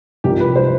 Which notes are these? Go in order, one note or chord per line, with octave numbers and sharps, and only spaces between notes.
C2 C3 F3 G4
B4
C5